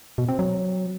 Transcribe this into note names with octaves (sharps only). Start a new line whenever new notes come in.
B2
C4
F#3